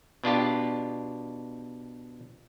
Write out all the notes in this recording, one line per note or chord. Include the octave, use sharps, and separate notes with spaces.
B2 D4 F4 G4